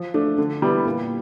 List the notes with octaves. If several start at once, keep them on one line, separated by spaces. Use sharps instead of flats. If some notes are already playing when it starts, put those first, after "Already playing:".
Already playing: F3
A3 D4
D3
G3 B3 E4
A#2